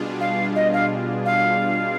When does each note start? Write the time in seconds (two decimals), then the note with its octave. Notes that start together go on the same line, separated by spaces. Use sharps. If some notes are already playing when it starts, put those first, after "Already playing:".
Already playing: B2 G3 D4 F4 G#4
0.20 F5
0.55 D#5
0.73 F5
1.25 F5